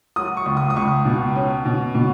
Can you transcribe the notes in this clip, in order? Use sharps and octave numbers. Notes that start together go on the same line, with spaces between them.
F#3 D#6
C#6
C#2
D#6
D#6
C#2 C#6
B2
C#4
B2
B2